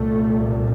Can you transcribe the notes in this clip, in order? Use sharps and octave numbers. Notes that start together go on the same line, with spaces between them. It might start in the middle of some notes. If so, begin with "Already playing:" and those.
Already playing: C2 A#2 A3